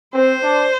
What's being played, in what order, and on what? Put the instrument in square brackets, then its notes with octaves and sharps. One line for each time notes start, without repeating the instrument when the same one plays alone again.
[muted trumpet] C4 [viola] C5
[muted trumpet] D4